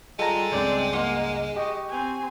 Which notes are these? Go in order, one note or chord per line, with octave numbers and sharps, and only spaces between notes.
G3 G#3 F4 A4 G5 A#5
C#2 G2 C#3 C4 D5
A#3 F#5 C6 D6
G4 D#5 G5 C#6
C4 G#5